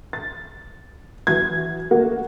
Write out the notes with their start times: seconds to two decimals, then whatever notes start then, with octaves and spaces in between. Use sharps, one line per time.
0.13 A6
1.27 E3 F#3 G#6
1.91 A3 A#3 F#4